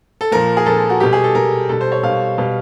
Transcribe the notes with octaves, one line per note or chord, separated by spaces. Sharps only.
A4
A#2 F3 A#4
G#4
A#2 F3 A4
F#4
B2 G3 G4
G#4
A4
B2 G3 A#4
B2 G3 A4
C5
C#5
B2 G3 F5
B2 G3